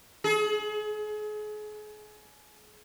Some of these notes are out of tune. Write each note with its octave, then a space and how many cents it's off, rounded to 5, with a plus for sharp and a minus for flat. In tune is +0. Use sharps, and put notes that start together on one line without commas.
G#4 +35